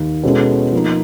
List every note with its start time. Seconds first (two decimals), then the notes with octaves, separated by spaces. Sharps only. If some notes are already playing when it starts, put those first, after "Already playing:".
Already playing: D#2
0.23 B2 G#3 C#4 E4 A4
0.72 F3 A#3 D#4